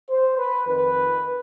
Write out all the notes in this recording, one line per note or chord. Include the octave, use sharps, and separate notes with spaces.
C5
B4
F2 D#3 B4